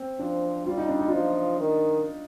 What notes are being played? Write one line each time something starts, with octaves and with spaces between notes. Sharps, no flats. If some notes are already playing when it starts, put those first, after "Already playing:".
Already playing: C4
F3 D4
G3 F4
D#4
D4
D#4
F4
F3 D#4
D#3